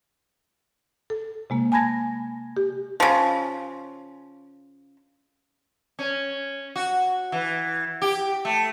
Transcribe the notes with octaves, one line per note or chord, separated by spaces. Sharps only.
A4
C3 G#3 A#3
G#5 A5 B5 G#6 A#6
G4
C#3 F3
C#4
F#4
E3
G4
A3